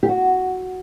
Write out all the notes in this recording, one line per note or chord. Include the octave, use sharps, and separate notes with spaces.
G4
F#4